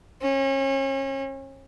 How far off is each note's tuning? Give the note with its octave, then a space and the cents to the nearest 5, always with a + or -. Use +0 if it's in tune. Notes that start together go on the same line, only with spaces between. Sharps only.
C#4 -35